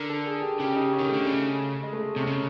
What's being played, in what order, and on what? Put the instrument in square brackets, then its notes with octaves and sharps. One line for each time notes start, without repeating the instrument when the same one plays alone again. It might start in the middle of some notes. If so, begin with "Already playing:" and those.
Already playing: [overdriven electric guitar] D3 [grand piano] A#4
[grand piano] A4
G#4
G4
[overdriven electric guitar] C#3 [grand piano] G4
[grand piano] D#4
C#4
[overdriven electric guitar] D#3
[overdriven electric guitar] D3 [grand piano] A3
[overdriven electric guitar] C#3
[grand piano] G#3
A3
[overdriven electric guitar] C3 [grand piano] C#4
[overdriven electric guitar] C#3